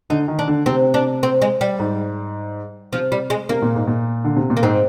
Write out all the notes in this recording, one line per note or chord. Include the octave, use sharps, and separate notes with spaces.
D3 D#4
D#3
D4
D3
C3 C4
D4
C4
G#3
G3
G#2
C3 F3
G3
G#3
C3 A#3
A#2
G#2
A#2
D3
C3
A#2
A#3
G#2 C4